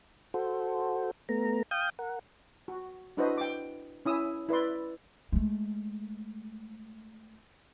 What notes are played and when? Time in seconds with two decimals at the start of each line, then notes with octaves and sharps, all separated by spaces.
0.34 F#4 A4 C5
1.29 A3 B3 A#5
1.71 F5 G5 D#6 G6
1.99 A#4 F#5
2.68 F#4
3.17 D4 E4 F#4 B4 C5 D#5
3.38 G5 D6
4.05 C#4 E4 D#6 E6
4.49 E4 B4 D5 C6
5.32 G#3 A3